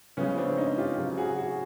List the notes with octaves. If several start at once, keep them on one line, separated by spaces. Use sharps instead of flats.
C#3 F3 G#3 B3 C#4
C4 D4
C#4 D#4
F4 G4
C#3 F#3
F#4 G#4
F#4 G#4